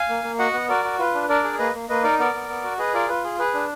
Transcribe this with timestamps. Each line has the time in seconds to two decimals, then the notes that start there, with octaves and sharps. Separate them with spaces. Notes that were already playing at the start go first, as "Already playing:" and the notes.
Already playing: F5 G#5
0.09 A#3
0.24 A#3
0.39 F#4 D#5 F#5
0.54 B3
0.69 F#4 A#4 D5
0.84 F#4
0.99 F4 B4
1.14 D4
1.29 D4 A#4 D5
1.44 G#4
1.59 A#3 B4 D#5
1.74 A#3
1.89 A#3 B4 D#5
2.04 D#4 A#4 D5
2.19 B3 A#4 D5
2.34 B3
2.49 B3
2.63 F#4
2.78 G#4 B4 D#5
2.94 F4 A#4 D5
3.08 F4 B4
3.24 G#4
3.39 G#4 B4
3.54 D4